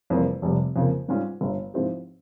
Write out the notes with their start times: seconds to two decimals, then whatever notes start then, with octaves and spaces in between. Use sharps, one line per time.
0.10 F1 F2 E3 G3 A#3
0.42 F1 F2 C3 G3
0.76 F2 C#3 F3 A#3
1.08 G#2 G3 C#4 F4
1.41 G1 G2 G3
1.74 G#2 F3 C4 E4 G4